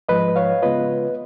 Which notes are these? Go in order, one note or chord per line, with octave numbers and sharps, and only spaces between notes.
G#2 F3 G#3 B4 D#5
C#5 F5
C#3 G#3 B3 F4 B4 D#5